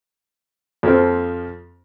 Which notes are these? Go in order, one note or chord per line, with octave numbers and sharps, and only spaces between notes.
F2 F3 C4